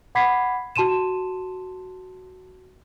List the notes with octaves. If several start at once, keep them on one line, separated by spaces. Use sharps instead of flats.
F#5 B5 D6 G#6 B6 C7
F#4 A5 C6 D#7 E7